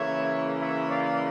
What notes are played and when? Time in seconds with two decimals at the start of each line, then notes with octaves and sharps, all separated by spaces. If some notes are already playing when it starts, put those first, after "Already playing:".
Already playing: C#3 E3 A#3 C#5 E5
0.59 C#5 E5
0.90 D5 F5